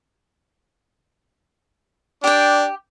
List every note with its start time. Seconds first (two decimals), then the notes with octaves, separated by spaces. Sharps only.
2.24 D4 G4 G5